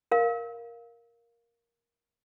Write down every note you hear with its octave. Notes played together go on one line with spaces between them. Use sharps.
A#4 F5